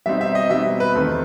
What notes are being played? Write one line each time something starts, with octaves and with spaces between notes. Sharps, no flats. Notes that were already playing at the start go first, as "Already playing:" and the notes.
B2 G3 C4 D#4 E5
E5
D#5
B2 G3 C4 D#4 E5
B4
E2 D#3 A3 C4